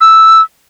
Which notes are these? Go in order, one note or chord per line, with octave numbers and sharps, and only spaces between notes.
E6